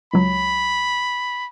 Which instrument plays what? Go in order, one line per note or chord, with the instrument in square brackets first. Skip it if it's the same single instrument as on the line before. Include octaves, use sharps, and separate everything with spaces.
[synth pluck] C#2 F#3 [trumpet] B5